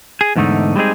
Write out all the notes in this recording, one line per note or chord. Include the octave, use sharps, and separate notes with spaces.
G#4
E2 G#2 D3 A3 D#4
G3 G#3 C4 D#4 G#4